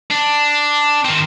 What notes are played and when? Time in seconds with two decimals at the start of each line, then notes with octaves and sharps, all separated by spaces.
0.11 D4
1.05 D#3 C4